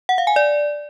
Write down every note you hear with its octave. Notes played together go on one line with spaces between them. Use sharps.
F#5
F5
G#5
D5